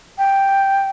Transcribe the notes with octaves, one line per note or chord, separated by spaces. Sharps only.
G5